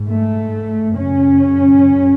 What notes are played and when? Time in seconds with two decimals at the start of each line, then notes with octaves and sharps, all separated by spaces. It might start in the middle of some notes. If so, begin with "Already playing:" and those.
Already playing: G#2
0.08 A3
0.95 F#2 C#3 C#4